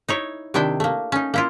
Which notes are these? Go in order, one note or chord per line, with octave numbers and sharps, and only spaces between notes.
D#4 E4 C#5
C3 D#3 D4 E4 G5
A3 A#3
C#4 D#4
A#3 E4 F4